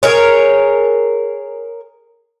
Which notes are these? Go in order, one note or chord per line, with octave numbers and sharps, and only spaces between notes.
G#4 A#4 C#5